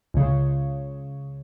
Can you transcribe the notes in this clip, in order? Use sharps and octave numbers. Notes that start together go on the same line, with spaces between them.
C#2 C#3